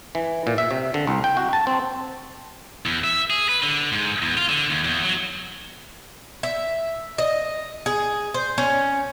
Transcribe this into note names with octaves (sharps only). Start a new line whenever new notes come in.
E3
A#2
E5
C3
D3
C2
G5
F#4
A5
C4
E2
E5
G#4
B4
D3
G#2
E2
F4
D3
D#2
E2
F#3
E5
D#5
G#4
C5
C#4